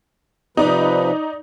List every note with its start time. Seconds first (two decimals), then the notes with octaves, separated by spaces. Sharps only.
0.57 C3 F3 D#4 B4 D5